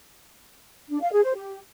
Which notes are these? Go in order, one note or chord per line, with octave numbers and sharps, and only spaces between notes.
D4
F5
G#4
C5
G4